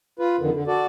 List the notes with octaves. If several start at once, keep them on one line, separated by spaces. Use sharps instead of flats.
F4 B4
F2 D3 D#3
D3
F#4 A4 D5